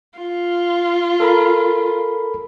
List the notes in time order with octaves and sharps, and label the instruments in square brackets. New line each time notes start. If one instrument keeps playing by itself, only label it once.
[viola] F4
[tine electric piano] A4 A#4 B5